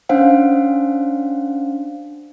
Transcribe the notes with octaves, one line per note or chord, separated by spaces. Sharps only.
C#4 D4 C5 F5 F#5